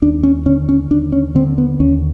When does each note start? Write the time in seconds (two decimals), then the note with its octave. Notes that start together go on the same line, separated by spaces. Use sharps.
0.02 D#2 D4
0.23 C#4
0.46 D3 C#4
0.69 C#4
0.91 D#2 D4
1.12 C#4
1.35 D3 C4
1.58 B3
1.80 D#2 C#4